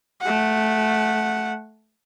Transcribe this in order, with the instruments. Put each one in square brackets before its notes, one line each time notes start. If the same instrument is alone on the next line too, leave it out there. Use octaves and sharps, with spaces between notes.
[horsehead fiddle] A3 F#5